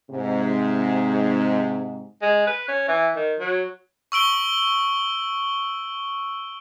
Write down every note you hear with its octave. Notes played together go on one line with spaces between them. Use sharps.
G#2 C3
G#3
B4
C#4
E3
D#3
F#3
C#6 E6 D7 G7